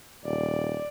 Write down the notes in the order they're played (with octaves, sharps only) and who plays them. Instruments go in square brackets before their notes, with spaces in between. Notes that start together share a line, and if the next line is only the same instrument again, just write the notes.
[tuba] D#1 [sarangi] D5